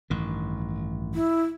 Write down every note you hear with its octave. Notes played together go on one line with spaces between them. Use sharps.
A1 G2 D#3
E4